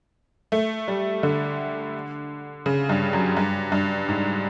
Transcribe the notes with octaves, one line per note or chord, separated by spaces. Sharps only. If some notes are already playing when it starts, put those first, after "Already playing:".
A3
G3
D3
C#3
G2
F#2
G2
G2
G#2